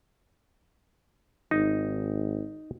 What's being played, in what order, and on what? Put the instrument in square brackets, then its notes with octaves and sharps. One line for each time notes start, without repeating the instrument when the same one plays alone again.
[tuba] G#1 [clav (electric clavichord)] D#4